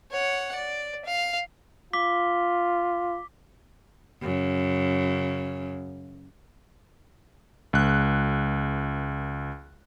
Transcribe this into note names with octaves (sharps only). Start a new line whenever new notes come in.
C#5 F#5
D5
F5
F4 D6 B6 G7
F#2 C#3
C#2 F#6